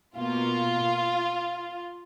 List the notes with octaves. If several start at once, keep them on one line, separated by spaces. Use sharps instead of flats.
B2 A#3 F4